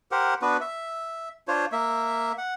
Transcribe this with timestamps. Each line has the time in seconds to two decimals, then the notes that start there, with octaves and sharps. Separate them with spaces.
0.12 G4 A#4 C5 F#5
0.42 B3 D4 F#4 B4
0.61 E5
1.48 D4 F4 C5 C#5
1.72 A#3 E5
2.38 F#5